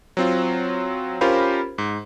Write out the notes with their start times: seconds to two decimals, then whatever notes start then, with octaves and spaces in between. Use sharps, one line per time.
0.17 F#3 C4 F4
1.21 C#4 F4 G4 A#4 C5 B5
1.78 G#2